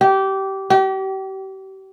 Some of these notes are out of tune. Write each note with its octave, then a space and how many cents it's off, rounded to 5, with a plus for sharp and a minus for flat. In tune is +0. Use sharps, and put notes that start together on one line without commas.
G4 -20
G4 -35